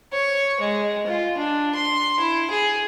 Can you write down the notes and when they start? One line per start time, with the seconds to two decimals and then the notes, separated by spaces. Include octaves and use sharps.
0.12 C#5
0.60 G#3
1.07 F4
1.38 D4
1.75 C6
2.20 E4
2.50 G#4